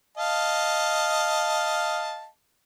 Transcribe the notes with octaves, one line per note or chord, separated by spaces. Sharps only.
D#5 F5 A5